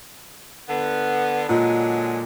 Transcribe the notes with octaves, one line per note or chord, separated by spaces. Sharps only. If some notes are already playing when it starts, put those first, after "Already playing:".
D3 B3
A#2 D3 F#3 G#3